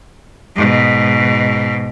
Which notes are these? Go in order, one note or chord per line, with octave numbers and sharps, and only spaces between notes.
G#2 B2